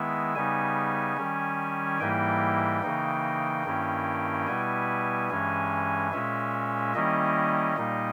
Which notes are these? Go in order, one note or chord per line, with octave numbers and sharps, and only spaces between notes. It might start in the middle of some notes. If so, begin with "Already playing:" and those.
Already playing: D#3 G#3 B3 E4 E5
C#3 G3 B3 D#4 G#5
D#3 G3 C#4
G#2 E3 G3 A#3 E4 G5
C#3 E3 A#3 D#4
G2 D#3 A#3 C#4 E4
B2 G3 B3 E4 G#5
G2 E3 G#3 C#4 G#5
A#2 G#3 C#4 E5
D#3 G3 A#3 C#4 E4 D#5
A#2 G3 A#3 D#4